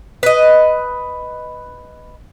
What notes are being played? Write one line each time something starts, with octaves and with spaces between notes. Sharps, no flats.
B4 D#5